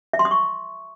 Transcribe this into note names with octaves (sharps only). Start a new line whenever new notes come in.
E5
C6
D#6
C#6